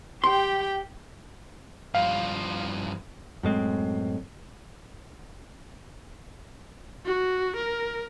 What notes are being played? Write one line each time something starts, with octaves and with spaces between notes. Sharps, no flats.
G4 G5 C6
G2 F3 F5
F#2 A2 G#3 C4
F#4
A#4